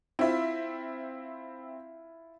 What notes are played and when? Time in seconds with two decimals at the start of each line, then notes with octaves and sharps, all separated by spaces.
0.19 C4 E4 F4 E5